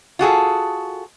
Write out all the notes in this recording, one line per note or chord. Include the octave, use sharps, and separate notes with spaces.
F4 F#4 G#4 A4